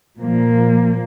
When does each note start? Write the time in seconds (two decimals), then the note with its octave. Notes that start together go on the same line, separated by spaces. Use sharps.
0.18 A#2 F3 A#3